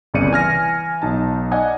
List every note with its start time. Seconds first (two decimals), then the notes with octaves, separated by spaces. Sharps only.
0.14 G1 C2 C#3 D5 C#7 D#7
0.31 E3 G#5 F6 A#6
1.02 B1 D#4 A5
1.51 D5 D#5 F#5 G#5 D#6